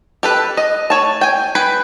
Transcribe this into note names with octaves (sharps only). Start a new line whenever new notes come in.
G4 A4 B4
D#5
A3 C#5 A5
G5 G#5
G#4 B4 G5 B5